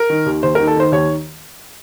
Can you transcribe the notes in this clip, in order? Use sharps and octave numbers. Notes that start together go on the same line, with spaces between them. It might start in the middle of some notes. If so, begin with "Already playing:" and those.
Already playing: A#4
D#3
D#2
D#2 C5
A#4
D#3
A4
D#3 C5
D#2 C#5